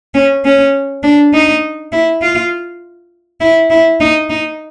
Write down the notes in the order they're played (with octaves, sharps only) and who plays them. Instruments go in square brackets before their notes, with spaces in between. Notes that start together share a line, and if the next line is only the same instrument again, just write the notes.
[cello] C#4
C#4
D4
D#4
E4
F4
E4
E4
D#4
D#4